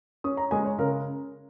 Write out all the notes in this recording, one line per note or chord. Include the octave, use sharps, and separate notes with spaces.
C#4 D#6
A#5
G#3 G#5
C#5
C#3 A#4